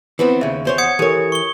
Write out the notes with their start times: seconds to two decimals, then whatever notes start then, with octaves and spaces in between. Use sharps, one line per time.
0.19 E3 B3 C4
0.41 D#2 C#3 E5
0.65 E2 C5 C#5
0.78 F#5 D#6 G#6 C#7
0.99 E3 G4 A4 A#4 C#5
1.32 C#6 G7